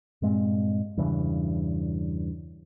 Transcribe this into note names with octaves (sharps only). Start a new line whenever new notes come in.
G2 A#2 G#3 C4
E2 G2 C#3 E3